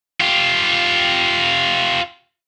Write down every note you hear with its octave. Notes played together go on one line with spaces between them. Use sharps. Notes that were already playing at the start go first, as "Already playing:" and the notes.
F4 G4